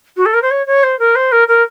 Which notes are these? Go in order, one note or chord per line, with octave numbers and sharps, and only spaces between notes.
F#4
A4
A#4
C5
C#5
C#5
C5
A#4
C5
A#4
A#4